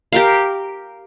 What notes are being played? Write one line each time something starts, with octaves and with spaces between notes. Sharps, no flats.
G4 A#4 F5